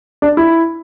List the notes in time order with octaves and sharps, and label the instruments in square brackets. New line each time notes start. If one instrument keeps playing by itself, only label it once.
[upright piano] D4
E4